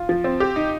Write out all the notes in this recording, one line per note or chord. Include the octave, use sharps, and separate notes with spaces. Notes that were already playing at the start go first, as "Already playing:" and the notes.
Already playing: F4
F3
C4
G4
D#4